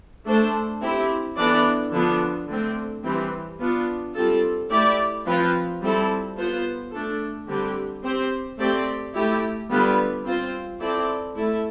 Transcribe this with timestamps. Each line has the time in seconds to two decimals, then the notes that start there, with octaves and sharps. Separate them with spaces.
0.26 A3 D4 A4 C5
0.82 C4 E4 G4
1.37 E3 B3 D4 A4 D5
1.93 D3 F3 B3 D4 F4
2.48 D3 A3 C4
3.04 E3 G3 C4 G4
3.60 B3 D4 F4
4.14 G3 C4 F4 A4
4.70 A3 E4 G4 D5
5.26 F3 C4 F4 B4
5.82 G3 C4 E4 A4
6.37 B3 F4 C5
6.92 A3 D4 A4
7.48 D3 G3 C4 G4
8.03 C4 G4 C5
8.58 A3 C4 G4 D5
9.15 A3 E4 G4
9.70 D3 G3 B3 F4 B4
10.25 C4 F4 C5
10.80 C4 E4 A4 D5
11.36 A3 E4 A4